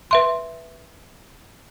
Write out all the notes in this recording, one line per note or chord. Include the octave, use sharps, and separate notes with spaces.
B4 E5 C6